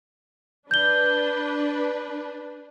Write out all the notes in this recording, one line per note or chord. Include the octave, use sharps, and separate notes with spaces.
D4 B4 G6 G7